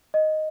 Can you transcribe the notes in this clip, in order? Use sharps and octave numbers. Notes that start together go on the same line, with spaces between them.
D#5